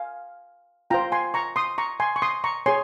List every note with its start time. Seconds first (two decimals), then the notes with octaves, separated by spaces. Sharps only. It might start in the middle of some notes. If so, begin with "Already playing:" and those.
Already playing: F5 G#5
0.90 F4 C5 G5 A#5
1.12 G#5 C6
1.34 A#5 C#6
1.56 C6 D#6
1.78 A#5 C#6
2.00 G#5 C6
2.16 C#6
2.22 C6 D#6
2.44 A#5 C#6
2.66 G#4 C#5 G#5 C6